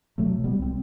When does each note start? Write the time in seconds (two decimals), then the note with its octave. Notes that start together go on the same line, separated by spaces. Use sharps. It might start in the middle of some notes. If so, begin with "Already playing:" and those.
0.18 B2 F#3 A3
0.38 B2
0.44 G3 B3
0.56 C2
0.62 C4